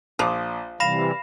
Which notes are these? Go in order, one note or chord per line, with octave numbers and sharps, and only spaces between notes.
A#1 F3 D6 D#6
C3 E3 G3 F5 B5 A#6 E7